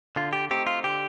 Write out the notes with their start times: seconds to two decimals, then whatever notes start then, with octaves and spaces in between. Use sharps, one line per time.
0.16 D3 F4
0.33 G4
0.51 A3 C4 D#4 G4
0.67 F4
0.84 D3 G4